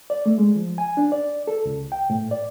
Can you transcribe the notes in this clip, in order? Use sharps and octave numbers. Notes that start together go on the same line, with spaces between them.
D5
A3
G#3
F3
G#5
D4
D5
A4
C#2
G5
A2
D5